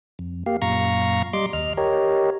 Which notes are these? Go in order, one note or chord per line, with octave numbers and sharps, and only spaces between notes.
F2
A#3 G4 F5
F#2 A#2 F5 A#5 C#6 A#6
G3 D#5 C6 D6
D#2 D#5 F6
G4 A#4 C#5 D#5